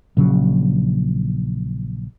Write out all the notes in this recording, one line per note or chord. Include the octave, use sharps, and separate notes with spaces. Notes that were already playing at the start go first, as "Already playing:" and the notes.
A#1 C#3 F#3